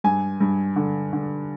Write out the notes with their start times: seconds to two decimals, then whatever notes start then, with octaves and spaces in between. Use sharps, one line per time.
0.04 G2 G#5
0.41 G2
0.76 D3
1.13 D3